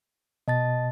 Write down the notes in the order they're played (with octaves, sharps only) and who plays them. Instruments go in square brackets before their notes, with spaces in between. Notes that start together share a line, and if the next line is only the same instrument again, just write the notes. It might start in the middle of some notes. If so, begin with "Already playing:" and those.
[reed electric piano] B2 [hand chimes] D#5 A5 A6